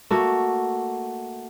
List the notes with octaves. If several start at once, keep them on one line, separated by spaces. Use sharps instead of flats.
A3 A#3 F#4